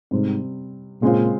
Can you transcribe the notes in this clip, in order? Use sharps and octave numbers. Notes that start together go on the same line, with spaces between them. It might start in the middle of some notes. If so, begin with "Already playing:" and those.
G#2 C3 G3 C4
A#2 C#3 G#3 C4 F4